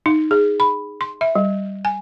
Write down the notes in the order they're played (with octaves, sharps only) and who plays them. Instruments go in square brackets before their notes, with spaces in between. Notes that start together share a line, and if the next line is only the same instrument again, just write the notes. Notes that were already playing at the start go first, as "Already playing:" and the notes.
[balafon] D#4
G#4
B5
C6
E5
G3
G#5